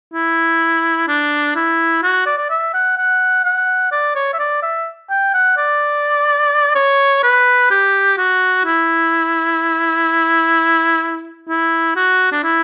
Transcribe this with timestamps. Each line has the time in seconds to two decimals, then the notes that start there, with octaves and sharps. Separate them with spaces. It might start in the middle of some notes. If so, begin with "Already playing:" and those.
0.13 E4
1.08 D4
1.55 E4
2.02 F#4
2.26 D5
2.38 D5
2.50 E5
2.74 F#5
2.97 F#5
3.44 F#5
3.92 D5
4.15 C#5
4.33 E5
4.39 D5
4.62 E5
5.10 G5
5.34 F#5
5.57 D5
6.75 C#5
7.23 B4
7.70 G4
8.17 F#4
8.65 E4
11.48 E4
11.96 F#4
12.32 D4
12.43 E4